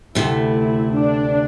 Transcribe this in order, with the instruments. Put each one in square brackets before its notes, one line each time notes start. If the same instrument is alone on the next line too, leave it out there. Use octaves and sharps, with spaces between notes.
[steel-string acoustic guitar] D2 C3 A3 [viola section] E4
[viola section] D4